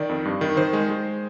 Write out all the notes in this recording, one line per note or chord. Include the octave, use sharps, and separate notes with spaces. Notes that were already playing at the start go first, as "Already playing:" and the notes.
Already playing: D#3 D5
F2
G2
D#3
D#3 C5
G#3
G#3